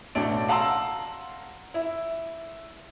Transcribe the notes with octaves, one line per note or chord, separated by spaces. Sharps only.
A1 B2 A3 D4 D7
F5 F#5 A5 A#5 C6 E6
E4